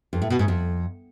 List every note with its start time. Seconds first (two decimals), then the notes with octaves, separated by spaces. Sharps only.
0.13 F2
0.22 A2
0.30 B2
0.39 G#2
0.48 F2